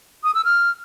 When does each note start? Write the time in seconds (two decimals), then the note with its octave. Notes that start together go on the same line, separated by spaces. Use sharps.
0.24 D#6
0.35 E6
0.45 F6